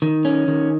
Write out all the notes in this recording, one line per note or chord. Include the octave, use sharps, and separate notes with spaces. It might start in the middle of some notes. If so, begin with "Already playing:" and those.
D#3
C#4
D#3